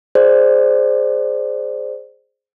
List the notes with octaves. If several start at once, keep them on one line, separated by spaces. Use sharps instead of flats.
G#4 C5 D5